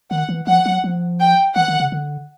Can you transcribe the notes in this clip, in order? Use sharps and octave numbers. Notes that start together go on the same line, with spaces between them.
D#3 F#5
E3
F3 F#5
F#3
F3
G5
E3 F#5
D#3
C#3
D3